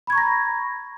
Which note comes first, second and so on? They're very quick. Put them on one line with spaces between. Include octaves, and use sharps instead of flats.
B5 G#6 C#6 A#5 A#6